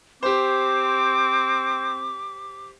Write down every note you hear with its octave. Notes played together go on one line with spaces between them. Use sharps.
C4 G4 C5 D6